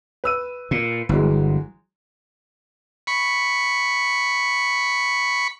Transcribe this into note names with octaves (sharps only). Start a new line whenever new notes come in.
B4 E6 D#7
A#2
G1 E3 F#3 G#3
B5 C#6